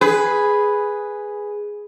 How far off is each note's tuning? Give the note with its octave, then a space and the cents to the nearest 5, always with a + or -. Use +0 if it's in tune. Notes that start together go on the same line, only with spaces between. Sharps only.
G#4 +0 B4 +0